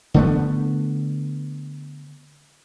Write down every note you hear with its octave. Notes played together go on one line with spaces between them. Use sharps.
D3 A3 B3